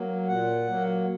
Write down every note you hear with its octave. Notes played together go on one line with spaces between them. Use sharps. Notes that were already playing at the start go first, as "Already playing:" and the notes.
Already playing: F#3 A#3
A#2 F#5
F#3 A#3